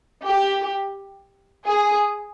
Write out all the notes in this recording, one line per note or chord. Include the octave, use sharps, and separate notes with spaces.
G4
G#4